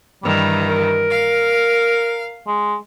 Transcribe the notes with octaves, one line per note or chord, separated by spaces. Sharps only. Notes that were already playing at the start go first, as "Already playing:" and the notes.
G2 D#3 E3 G3
A#4
F5
G#3